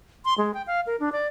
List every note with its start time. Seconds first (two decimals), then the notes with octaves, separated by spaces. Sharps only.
0.25 C6
0.38 G#3
0.54 G5
0.67 F5
0.87 A#4
1.00 D4
1.12 D5